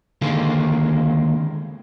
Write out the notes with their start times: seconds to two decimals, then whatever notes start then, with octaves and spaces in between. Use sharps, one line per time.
0.22 D#2 D3 D#3 G#3 A#3 C4